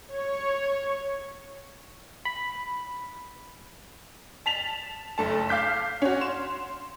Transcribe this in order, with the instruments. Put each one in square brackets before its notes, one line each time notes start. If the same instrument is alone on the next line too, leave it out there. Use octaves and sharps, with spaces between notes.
[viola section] C#5
[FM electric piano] B5
[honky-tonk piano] A5 B6 F7 F#7
F#1 A3 A5
F5 D6 G6 B6
C#4 F#4
C6 E7